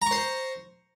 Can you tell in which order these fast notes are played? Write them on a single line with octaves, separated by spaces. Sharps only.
A#5 C#6 C5